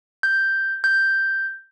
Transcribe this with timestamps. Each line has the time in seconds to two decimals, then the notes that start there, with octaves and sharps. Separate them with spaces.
0.23 G6
0.84 G6